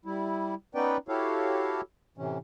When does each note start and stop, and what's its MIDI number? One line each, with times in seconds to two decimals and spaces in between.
0.05 0.55 55
0.05 0.55 64
0.75 0.97 59
0.75 0.97 61
0.75 0.97 63
0.75 0.97 71
0.75 0.97 74
0.75 0.97 79
1.08 1.81 64
1.08 1.81 66
1.08 1.81 67
1.08 1.81 69
1.08 1.81 73
1.08 1.81 77
2.18 2.38 45
2.18 2.38 48
2.18 2.38 52
2.18 2.38 61